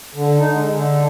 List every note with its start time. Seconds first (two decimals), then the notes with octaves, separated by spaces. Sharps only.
0.15 D3
0.39 D#4
0.53 G#3
0.73 D3